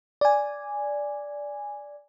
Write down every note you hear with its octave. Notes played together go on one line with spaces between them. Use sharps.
D5 G#5